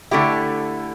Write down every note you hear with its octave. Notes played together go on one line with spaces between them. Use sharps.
D3 A3 E4 G4